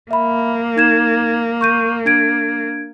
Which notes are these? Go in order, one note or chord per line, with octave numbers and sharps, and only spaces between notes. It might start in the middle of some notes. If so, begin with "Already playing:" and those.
A#3 E5 B5
D#4 G#6 E7
C#6 G6 D#7
D4 G#6 D7